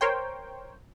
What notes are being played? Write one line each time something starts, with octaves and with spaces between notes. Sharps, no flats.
A#4 C5 C#5 G5